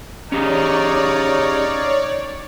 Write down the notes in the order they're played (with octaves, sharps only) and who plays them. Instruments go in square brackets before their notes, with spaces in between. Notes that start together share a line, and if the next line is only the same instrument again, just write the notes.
[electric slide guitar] C#4 G4 G#4 [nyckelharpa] D#4 F5 [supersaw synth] C#5 D5